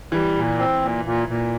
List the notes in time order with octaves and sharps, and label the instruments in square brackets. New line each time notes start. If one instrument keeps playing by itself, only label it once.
[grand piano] E3 [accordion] G3
[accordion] A#2
C4
A#2
A#2
A#2